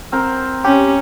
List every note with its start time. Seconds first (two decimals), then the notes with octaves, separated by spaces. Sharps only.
0.12 C4 A#4
0.65 C#4 G4